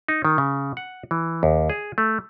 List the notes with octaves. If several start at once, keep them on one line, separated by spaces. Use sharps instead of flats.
D#4
D#3
C#3
F#5
E3
D#2
G#4
A3